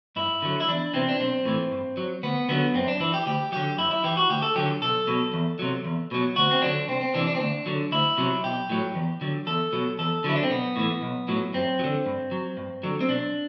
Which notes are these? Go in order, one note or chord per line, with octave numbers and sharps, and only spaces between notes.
G2 E4
D3 F#3
E4
E2 D4
C3 E3 C4
D4
B1 C4
A2 E3
G2
F#3
D2 B3
D3 F#3 B3
F#2 C4
D4
E3 E4
G4
D2 G4
D3 F#3 G4
F#2 E4
E4
E3 G4
F#4
D2 G4
A4
D3 F#3 G4
B1 A4
B2 F#3
E2
C3 F#3
E2
B2 F#3
D2 F#4
C4
D3 F#3 D4
C2 C4
C4
C3 E3 D4
D4
C4
D2 D4
D3 F#3
D2 E4
C3 F#3
B1 G4
A2 F#3
E2
D3 F#3
E2 A4
B2 F#3
E2 A4
D3 F#3 E4
D4
C4
B1 B3
A2 E3
B1
A2 F#3
F#2 C4
F#3
D3
G2
F#3
G2
D3 F#3
C4
B1 D4